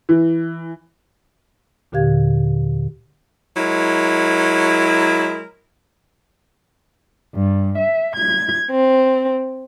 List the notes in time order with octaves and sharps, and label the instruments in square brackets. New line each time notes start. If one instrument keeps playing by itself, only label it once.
[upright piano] E3
[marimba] D#2 A#2 D3 G4 F5 G#6
[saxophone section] F#3 G#3 E4 A#4
[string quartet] G2
E5
G#6
C4